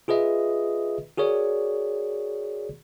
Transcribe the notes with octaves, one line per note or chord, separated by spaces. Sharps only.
F4 G#4 B4 D#5 E5
F#4 G#4 A#4 C#5 D5